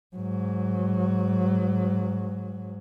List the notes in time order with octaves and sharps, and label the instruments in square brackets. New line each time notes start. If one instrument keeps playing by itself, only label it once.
[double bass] G#2 F#3